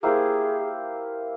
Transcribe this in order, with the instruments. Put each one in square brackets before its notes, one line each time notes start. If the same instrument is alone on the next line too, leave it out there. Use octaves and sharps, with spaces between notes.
[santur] A#3 E4 G4 C5 [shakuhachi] G#4